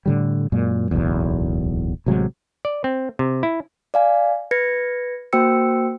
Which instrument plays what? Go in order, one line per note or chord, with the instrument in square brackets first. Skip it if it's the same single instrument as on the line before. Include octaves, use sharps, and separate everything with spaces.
[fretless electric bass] A2 D3 G3
F#2 A#2 G#3
D1 B1 E2
A1 C3 F#3 G#3
[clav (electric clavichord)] D5
C4
C3
E4
[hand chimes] D5 F5 G#5
B4 G#6 A#6 C#7
A#3 F#4 C5 G5 E6 C#7